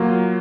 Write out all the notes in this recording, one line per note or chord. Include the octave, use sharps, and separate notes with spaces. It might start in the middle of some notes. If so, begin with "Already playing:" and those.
Already playing: F#3 A#3 F4